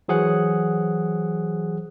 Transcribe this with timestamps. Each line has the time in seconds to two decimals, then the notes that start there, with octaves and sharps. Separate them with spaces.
0.08 E3 F#3 G#4 C5 F#5 F#6